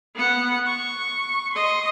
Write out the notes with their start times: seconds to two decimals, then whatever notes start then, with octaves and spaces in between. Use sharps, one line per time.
0.15 B3 F#5
0.67 C#6
1.53 D#5 C6